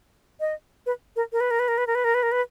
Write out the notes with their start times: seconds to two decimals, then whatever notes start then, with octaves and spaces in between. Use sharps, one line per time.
0.40 D#5
0.86 B4
1.16 A#4
1.33 A#4
1.40 B4
1.51 A#4
1.59 B4
1.68 A#4
1.78 B4
1.87 A#4
1.95 B4
2.04 A#4
2.14 B4
2.23 A#4
2.32 B4